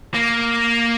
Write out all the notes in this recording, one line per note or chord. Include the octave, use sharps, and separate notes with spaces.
A#3